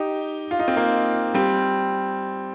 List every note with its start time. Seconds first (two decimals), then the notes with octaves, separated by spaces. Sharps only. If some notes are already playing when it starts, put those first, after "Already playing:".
Already playing: D#4 G4
0.51 F4
0.59 D#4
0.68 C4
0.76 A#3 D#4
1.34 G3 C4